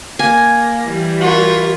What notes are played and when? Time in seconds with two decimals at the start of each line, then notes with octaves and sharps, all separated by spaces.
0.19 A#3 G#5
0.81 E3 G3
1.20 F4 F#4 A#4